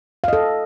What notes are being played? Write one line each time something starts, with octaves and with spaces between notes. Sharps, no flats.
A4 D#5 F5